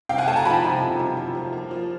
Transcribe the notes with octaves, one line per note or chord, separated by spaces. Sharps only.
C3 F5 G5
F#5 G#5
A3 G5 A5
G#5 A#5
F3 A5 B5
C3
C3
C3
F3
F3
A#3
F3